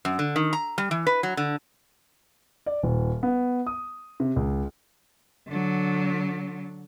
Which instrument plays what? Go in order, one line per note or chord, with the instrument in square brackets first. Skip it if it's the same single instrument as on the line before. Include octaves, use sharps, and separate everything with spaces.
[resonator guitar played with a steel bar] F#2
D3
D#3
A#5
G3
E3
B4
F#3
D3
[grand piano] D5
D#1
B3
D#6
C3
C#2
[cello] D3 F#3